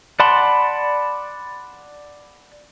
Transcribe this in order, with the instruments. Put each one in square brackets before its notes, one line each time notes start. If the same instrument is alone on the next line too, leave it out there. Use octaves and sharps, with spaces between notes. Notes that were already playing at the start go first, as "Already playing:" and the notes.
[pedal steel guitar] D5 F#5 A5 B5 C6